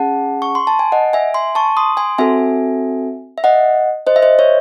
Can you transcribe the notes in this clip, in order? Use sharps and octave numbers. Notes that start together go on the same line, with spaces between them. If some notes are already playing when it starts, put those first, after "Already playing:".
Already playing: C#4 G#4 F#5 A5
C#6
C6
A5
G#5
D#5 F#5
E5 G#5
G#5 C6
A5 C#6
C6 D#6
G#5 C6
C4 F#4 A4 E5 G#5
E5
D#5 F#5
C5 D#5
E5
C5 D#5
C#5 E5